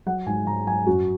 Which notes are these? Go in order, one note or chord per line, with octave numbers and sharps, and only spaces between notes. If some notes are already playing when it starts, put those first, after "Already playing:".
F#3 F#5
G#2 G#5
G#2 A#5
F#3 G#5
F#2 F#4